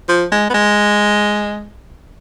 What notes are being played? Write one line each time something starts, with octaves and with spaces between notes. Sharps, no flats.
F3
G#3
B3
G#3